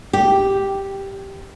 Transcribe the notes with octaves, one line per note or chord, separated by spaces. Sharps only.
G4